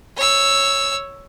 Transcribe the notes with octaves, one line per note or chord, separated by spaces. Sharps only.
C#5 E6